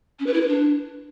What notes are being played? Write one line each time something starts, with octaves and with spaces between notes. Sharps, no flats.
C#4
B4
E4
B4
D4